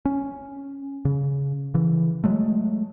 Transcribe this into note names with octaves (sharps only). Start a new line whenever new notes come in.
C#4
C#3
C#3 E3
F#3 G#3 A3